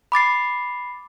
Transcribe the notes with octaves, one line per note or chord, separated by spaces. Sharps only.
B5 D6 A6 C7